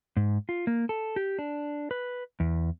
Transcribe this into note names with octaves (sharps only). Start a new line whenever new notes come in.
G#2
F4
A#3
A4
G4
D4
B4
E2